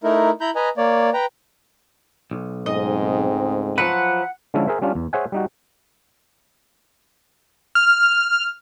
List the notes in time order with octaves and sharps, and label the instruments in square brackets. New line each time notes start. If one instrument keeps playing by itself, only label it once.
[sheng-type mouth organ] A3 D#4 E4 A#4
E4 A#5 B5 G6
B4 D#5 G#5 A#5
A#3 C#5 D5
B4 G5 A#5
[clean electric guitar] B1
[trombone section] C#2 A3 C4 [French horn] G#2 [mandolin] D#5
[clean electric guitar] F3 F#3 B4 [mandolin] F#5
[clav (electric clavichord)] D3 F3 G#3 C#4 E4 A4
G#4 A#4 C5 E5
G3 C#4 D4 F4
E2
G#4 C5 C#5 E5 F#5 G#5
G3 D#4 F#4
[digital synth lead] F6